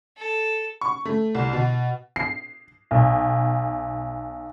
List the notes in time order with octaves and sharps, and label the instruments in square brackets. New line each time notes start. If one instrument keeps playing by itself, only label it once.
[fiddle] A4
[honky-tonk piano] C#6
A3
C2
B2
C7
B1